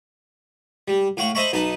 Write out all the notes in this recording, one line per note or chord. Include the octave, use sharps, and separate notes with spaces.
G3
A2 F5 F#5 C#6
C5 D#5 E5 A5 B5 C#6
B1 D#4 B4 A5